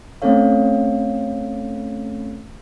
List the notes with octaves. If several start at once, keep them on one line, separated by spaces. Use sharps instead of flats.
A3 C4 C#4 A4 C#5 F5